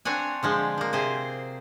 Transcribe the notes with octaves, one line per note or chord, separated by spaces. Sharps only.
C4 D4 C#5 F#5 G#5
D3 F3 G#3
F3 A#3
C3 G#4 C5